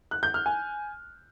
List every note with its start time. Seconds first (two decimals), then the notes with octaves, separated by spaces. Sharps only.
0.11 F#6
0.23 G6
0.34 F6
0.46 G#5